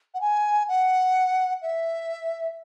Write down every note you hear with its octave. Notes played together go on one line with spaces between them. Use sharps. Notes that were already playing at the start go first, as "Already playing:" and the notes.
F#5
G#5
F#5
E5